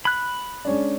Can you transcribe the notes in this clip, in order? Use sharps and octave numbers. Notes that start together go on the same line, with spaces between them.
B5 F#6
G#3 C#4 D4